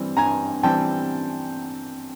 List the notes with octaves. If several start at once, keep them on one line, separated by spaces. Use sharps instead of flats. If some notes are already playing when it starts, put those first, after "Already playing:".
Already playing: G2 E3 G3 C4
G2 G#5 A#5
E3 G3 C4 G5 A5